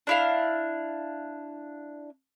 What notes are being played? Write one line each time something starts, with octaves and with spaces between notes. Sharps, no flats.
D4 E4 F5